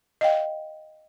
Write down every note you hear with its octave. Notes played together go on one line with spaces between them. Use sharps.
D#5 F5 G5